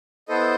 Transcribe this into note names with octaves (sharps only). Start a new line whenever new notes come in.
B3 E4 A4 C5 D#5